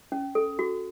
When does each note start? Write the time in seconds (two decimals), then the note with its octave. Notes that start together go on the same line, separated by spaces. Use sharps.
0.12 C#4
0.35 A4
0.59 F#4